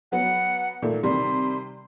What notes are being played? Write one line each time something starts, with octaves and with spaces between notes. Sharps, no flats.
F#3 B3 F#5
A#2 D#3 A3
C3 D#3 G3 C6